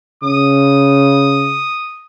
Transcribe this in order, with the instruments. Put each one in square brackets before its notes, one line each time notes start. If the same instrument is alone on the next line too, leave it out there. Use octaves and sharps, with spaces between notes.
[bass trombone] C#3 [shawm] D#6